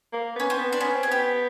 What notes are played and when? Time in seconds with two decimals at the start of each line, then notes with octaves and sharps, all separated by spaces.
0.13 A#3
0.36 B3 C#4
0.50 C4
0.58 B3
0.73 D4
0.81 B3 C#4
0.94 C4
1.03 G#4
1.07 B3 G4